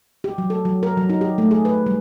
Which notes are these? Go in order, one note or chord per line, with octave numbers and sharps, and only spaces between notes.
G4
F#3
A4
F#3
A#4
F#3
D#4
G4
A3
G#4
B4
G3